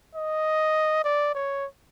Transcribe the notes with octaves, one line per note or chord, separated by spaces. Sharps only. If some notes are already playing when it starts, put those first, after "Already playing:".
D#5
D5
C#5